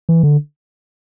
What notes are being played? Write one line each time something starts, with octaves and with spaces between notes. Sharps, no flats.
E3
D3